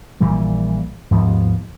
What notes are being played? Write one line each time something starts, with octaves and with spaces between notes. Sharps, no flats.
A#1 A#2 E3 G3
D#2 G#2 F3 B3